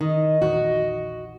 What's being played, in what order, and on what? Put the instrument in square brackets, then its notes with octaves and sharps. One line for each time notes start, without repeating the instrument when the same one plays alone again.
[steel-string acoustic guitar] D#3 [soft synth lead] D#5
[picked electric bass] A#1 E2 D#3 [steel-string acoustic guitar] F#4